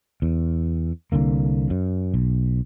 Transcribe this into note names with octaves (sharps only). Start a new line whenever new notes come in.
E2
C2 D3 A#3
F#2
B1